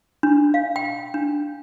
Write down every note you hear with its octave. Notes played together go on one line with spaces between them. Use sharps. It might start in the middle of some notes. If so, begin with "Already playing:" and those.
D4
F5
G5
D4